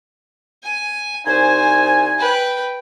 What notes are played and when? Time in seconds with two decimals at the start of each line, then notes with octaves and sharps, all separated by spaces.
0.63 G#5
1.26 C2 D#4 C5 G#5
2.18 B4 G5